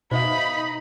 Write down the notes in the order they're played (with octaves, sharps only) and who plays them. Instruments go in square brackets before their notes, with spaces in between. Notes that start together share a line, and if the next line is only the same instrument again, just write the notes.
[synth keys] B2 [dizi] D#4 [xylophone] C5 E5 F5 [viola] B5